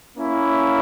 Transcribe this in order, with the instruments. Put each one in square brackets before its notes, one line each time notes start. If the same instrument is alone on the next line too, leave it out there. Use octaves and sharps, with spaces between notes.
[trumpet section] A#3 C#4 E4